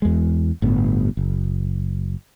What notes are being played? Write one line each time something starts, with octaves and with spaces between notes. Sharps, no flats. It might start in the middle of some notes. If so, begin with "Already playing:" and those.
E2 G#3
G1 A2 B3
F#1